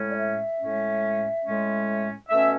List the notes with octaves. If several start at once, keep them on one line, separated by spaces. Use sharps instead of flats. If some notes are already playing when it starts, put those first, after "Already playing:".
Already playing: A2 G#3 C#4
D5
E5
A2 G#3 C#4
A2 G#3 C#4
B2 A3 C#4 E5